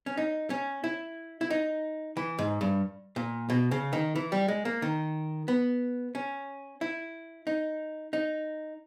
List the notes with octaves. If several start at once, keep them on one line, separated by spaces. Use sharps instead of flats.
C#4
D#4
C#4
E4
E4
D#4
E3
G#2
G2
A#2
B2
C#3
D#3
E3
G3
G#3
A#3
D#3
B3
C#4
E4
D#4
D#4